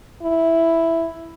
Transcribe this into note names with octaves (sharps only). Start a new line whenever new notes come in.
E4